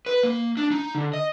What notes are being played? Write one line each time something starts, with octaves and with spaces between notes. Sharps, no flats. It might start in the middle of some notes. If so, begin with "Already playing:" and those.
B4
A#3
D4
D#4
D3
D#5